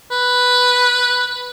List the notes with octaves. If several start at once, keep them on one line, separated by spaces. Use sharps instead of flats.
B4